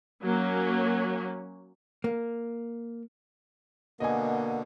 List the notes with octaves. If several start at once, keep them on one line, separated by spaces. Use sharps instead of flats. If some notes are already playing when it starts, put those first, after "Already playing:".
F#3 A#3 C#4
A#3
B2 D3 A#3 D#5 G#5